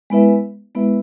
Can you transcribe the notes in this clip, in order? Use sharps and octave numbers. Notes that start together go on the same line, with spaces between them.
G#3 B3 E4 B4 E5
G#3 B3 E4 B4 E5